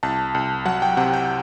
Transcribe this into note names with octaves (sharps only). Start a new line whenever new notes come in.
C2 A5
C2
F#3 F#5
G5
C3 F#5
G5